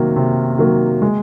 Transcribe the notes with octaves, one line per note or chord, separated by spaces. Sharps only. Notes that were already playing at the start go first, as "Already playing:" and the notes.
Already playing: C3 D#3 F#3 A#3
C3
D#3 F#3 A#3
G#3